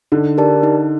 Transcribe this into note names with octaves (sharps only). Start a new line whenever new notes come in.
D3 D#4
G4 A#4 D5 A5
D#4